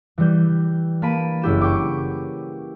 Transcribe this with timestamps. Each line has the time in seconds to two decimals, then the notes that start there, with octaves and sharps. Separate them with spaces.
0.18 E3 G3 G6
1.02 A#3 A5 B5 D7 D#7
1.42 F#1 E4 G4 E7
1.61 G5 C#6 D6